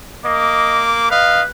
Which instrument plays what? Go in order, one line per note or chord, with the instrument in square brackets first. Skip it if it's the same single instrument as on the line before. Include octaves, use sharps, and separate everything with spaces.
[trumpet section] A#3 D6 [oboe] D#5
[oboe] B4 [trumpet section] D#5 F5